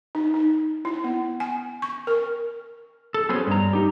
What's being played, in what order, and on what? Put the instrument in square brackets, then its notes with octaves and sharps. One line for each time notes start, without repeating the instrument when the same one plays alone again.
[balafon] D#4
D#4
E4
B3
G#5
C#6
A#4
[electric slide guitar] A4
F#3 B3 C#4 G#4 C5
G2 A#5
D#4 G4